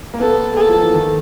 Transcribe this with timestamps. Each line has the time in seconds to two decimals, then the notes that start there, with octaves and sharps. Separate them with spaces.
0.14 A#3
0.20 B3 A4
0.56 A#3 A4
0.69 F3
0.82 E3
0.94 D#3